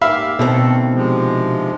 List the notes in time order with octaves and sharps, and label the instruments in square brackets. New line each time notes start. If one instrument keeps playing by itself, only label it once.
[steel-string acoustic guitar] G#2 A#3 D5 [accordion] G4 [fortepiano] E5 F5 B5
[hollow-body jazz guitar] B2 [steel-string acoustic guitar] D3 D#3 C4 [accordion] A3 A4
[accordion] C3 F3 G#3